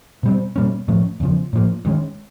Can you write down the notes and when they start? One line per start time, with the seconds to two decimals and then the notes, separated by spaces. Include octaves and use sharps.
0.23 B2 G3 C4
0.56 B2 G3 A#3 C#4
0.88 A2 F3 A3 C#4
1.20 E2 C#3 F3
1.53 A2 F3 A#3
1.85 G2 D#3 G#3 C#4